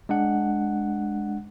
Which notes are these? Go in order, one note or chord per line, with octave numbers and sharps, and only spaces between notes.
G#3 D4 F#5